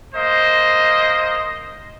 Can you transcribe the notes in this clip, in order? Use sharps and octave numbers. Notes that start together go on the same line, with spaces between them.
A#3 C5 D#5